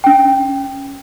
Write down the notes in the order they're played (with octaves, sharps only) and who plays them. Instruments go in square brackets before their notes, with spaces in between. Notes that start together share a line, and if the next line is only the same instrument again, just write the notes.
[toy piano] C#4 G5